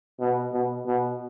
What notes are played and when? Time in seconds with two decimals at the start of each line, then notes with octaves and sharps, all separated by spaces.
0.20 B2
0.53 B2
0.86 B2